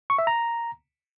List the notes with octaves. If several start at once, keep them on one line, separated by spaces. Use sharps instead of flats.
C#6
E5
A#5